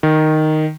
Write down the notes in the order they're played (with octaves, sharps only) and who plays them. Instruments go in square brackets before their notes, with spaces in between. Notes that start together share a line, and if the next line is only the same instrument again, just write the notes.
[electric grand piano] D#3